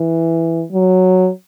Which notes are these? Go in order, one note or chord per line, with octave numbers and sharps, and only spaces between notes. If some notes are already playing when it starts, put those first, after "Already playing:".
Already playing: E3
F#3